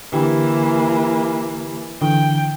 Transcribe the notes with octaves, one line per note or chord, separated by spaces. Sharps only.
D3 E3 A#3 G4
D3 E3 G5